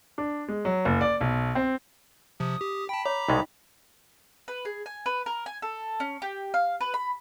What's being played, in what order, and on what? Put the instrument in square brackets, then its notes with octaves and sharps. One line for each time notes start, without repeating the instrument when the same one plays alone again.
[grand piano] D4
G#3
F#3
F#1
D5
B1
C4
[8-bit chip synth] C3 F3 [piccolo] D#6
[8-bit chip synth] G4
[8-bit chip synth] G5 A5 [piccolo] B5
[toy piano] C#5 [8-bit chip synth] A#5 D6
[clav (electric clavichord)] C2 B2 G#3 [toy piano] D#4 D#5 G5
[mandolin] B4
G#4
G#5
B4
A#4
G#5
A4
C#4
G4
F5
B4
B5